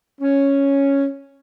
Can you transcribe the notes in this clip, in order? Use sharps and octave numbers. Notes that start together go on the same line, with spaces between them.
C#4